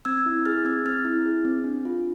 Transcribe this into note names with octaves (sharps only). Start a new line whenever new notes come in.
C4 E6 G#6
E4
G#4 F6 A6
C4 E6 G#6
C4 F6 A6
E4
G#4
C4
D4
F4